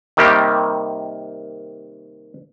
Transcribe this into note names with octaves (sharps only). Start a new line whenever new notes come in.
C3 D#3 G3 A#3 G4